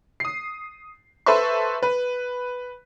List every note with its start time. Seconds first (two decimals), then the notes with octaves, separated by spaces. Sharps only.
0.20 D#6 C7
1.26 A4 B4 C5 E5 C6 C#6
1.83 B4